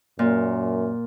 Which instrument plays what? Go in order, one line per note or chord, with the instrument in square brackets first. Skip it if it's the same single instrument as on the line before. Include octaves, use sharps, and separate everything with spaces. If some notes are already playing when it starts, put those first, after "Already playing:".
[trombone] F#2 [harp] A#2